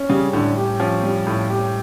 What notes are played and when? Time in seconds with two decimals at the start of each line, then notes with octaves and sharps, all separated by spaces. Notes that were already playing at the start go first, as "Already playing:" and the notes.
Already playing: C#4
0.09 C#3 G3
0.33 A2 D3
0.56 G4
0.80 F3 C#4
1.03 G3
1.27 A2
1.50 G4